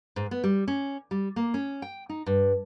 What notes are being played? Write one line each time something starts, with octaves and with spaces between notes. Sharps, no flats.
G#2
B3
G3
C#4
G3
A#3
C#4
G5
D#4
G2